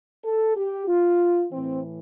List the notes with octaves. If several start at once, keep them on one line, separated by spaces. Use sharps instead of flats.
A4
G4
F4
A2 E3 C4